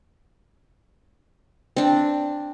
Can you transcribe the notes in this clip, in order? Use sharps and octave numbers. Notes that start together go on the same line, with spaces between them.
C4 D4